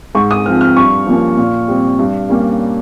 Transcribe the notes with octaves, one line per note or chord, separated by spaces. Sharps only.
G#2 C#6
D#6
F3 C4 F6
F6
G2 C#6
F3 A#3 C#4
A#2
G3 C4
G2
G3 A#3 C#4